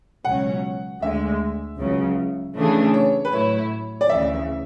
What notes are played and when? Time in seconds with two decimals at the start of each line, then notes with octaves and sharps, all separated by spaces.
0.24 C#2 B2 F#3 C#4 F#5
1.02 D2 D3 G#3 E5
1.79 C#2 C#3 F#3
2.56 C#3 E3 A3 D4 G#4
2.94 C#5
3.25 B4
3.33 A2 F#3 A3 E4 C#5
4.01 D5
4.09 D2 C#3 E3 E5